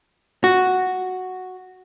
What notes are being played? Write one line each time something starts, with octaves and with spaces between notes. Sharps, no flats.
F#4